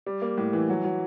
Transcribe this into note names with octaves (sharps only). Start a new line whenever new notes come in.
G3
A#3
A2
E3
F#3
F#3